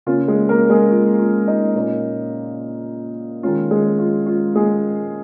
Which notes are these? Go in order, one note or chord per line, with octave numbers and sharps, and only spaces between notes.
C#3 A#3 C#4 F4
G#3 G#4
A#3 A#4
G#3 G#4
F4
F4
D#4
A#2 A#3 C#4
D#3 G#3 C#4 F4
G#3 G#4
F4
F4
G#3 G#4